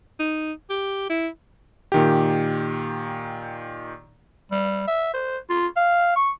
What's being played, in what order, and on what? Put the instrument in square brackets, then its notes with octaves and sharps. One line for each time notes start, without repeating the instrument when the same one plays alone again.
[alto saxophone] D#4
G4
E4
[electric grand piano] A#2 D#3 G4
[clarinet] G3
E5
C5
F4
F5
C#6